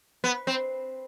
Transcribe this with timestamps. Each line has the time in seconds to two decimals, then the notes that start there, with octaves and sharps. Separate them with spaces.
0.24 B3
0.47 C4